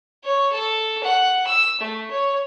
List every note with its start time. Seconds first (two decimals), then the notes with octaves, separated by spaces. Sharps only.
0.24 C#5
0.53 A4
1.03 F#5
1.47 E6
1.81 A3
2.11 C#5